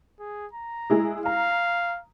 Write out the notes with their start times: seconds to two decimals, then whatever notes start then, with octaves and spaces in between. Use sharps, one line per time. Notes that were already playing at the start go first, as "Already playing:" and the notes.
0.19 G#4
0.53 A#5
0.90 G#3 E4 G#4
1.26 F5 A#5